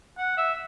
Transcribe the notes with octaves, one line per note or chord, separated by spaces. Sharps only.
F#5
E5